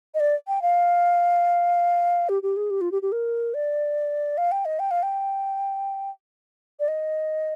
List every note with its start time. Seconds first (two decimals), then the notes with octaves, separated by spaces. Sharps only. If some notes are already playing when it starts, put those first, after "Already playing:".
0.15 D#5
0.20 D5
0.48 G5
0.62 F5
2.29 G4
2.43 G4
2.57 G#4
2.70 G4
2.81 F4
2.92 G4
3.02 G4
3.12 A#4
3.54 D5
4.38 F5
4.52 G5
4.65 D#5
4.79 G5
4.91 F5
5.03 G5
6.80 D5
6.88 D#5